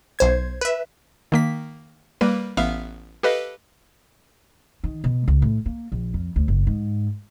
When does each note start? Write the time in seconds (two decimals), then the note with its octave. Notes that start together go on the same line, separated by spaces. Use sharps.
0.19 B1 C5 G#6
0.61 B4 E5
1.32 D#3 A#3 B6
2.21 G3 A#3 B4
2.57 A1 B3 E5 F5 F6
3.23 G4 A4 B4 D#5 F5
4.84 D#3
5.04 B2
5.28 C#2
5.42 A2
5.66 A#3
5.92 A#1
6.14 F2
6.36 D2
6.48 F#1
6.67 G#2